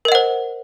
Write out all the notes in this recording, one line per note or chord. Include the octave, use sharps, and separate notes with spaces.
A#4 C5 D#5 F#5